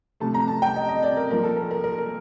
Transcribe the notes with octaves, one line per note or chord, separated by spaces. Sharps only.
C3 F3 A3 A5
A#5
A5
G5
D#5
D#5
D5
A#4
A#2 F3 A#3 A#4
A4
A#4
A#4
A#4
A#4